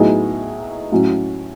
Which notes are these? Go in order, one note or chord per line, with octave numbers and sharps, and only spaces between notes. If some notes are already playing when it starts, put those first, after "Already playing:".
Already playing: A2 F#3 B3 D#4 G#4
A2 F#3 C#4 F#4